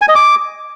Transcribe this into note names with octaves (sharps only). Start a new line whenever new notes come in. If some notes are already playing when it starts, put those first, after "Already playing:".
G#5
D#5
D6